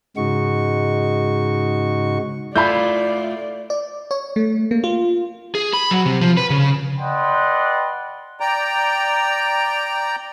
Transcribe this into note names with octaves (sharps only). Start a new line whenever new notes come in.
G#2 C#3 G#3 D#4 F#4 C#6
A3 E4 F4 D5 B5 G6
D5
C#5
A3
A#3
F4
G#4
B5
F#3
C3
F3
B4
C#3
B4 D5 D#5 F#5 G5 C6
D5 G5 A#5